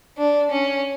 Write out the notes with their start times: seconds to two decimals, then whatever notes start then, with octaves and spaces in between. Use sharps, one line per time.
0.18 D4
0.51 C#4